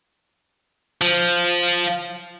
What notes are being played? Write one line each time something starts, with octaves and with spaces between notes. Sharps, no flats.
F3